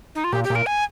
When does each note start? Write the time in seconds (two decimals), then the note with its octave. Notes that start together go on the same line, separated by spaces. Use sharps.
0.15 D#4
0.24 F4
0.33 A#2 G4
0.44 G4
0.50 A#2
0.55 A#4
0.66 G#5